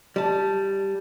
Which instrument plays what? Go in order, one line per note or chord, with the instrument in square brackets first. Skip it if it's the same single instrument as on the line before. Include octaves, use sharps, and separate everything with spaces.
[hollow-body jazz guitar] G3 A5